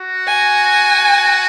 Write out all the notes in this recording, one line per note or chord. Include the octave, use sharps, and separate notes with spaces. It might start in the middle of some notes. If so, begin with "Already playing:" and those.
Already playing: F#4
G#5